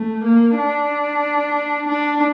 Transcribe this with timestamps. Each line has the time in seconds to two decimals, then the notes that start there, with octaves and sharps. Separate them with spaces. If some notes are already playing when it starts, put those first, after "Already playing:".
Already playing: A3
0.24 A#3
0.57 D4
1.88 D4